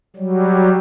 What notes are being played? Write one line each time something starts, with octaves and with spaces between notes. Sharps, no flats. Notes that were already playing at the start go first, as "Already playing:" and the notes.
F#3 G3